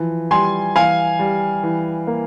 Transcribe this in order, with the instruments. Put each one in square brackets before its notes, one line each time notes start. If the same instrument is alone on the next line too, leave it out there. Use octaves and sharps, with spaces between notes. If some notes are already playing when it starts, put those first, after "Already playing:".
Already playing: [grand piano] E3 F3
[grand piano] G3 [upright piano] G#5 C6
[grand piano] E3 [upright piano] F5 G#5
[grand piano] G3
E3
A#3